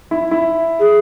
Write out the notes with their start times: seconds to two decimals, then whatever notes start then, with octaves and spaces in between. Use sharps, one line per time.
0.11 E4
0.31 E4
0.79 G#4